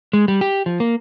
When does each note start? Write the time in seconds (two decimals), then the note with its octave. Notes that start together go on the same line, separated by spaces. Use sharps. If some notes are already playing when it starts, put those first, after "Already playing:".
0.13 G#3
0.28 G3
0.41 G4
0.66 F3
0.80 A#3